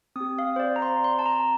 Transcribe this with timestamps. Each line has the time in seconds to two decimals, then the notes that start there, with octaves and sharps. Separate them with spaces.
0.16 C4 G4 D#6
0.39 F5
0.56 C5
0.59 D5
0.76 A#5
0.82 C6
1.04 C6
1.19 A5
1.26 A#5